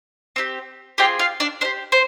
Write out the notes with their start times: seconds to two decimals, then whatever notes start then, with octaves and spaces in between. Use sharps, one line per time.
0.36 C4 D#4 G4
0.98 C4 F4 G4 G#4 G5
1.19 F4 F5
1.40 D4 D5
1.61 D4 G4 C5
1.92 C5